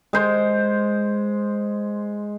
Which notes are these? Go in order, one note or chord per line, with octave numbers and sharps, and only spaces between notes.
G#3 C5